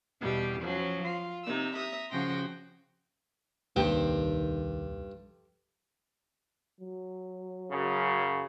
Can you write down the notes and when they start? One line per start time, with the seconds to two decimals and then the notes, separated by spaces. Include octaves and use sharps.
0.21 E2 B2 G3 G4
0.60 F3 F#3 C#4
1.04 F4
1.44 C3 D#4 E6
1.74 E5 A#5 D#6
2.10 C#3 F3 F#4 G5 C6 A#6
3.76 D#1 C2 G2 D#3 A#3 G4 A4 C5
6.80 F#3
7.71 F#2 C#3